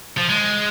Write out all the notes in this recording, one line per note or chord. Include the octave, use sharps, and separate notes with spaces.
F3
G#3